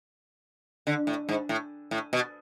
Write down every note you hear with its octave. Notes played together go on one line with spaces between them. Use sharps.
D3
A2
G#2
A2
A2
B2